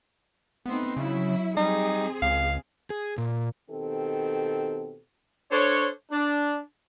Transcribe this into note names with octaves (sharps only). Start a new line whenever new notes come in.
A3 B3 C4 D#4
C#3 F#3 E4
G3 C4 D#4 G#4
C#2 F5
G#4
A#2
B2 D#3 C4 G4 A4
D4 A4 C5 C#5
D4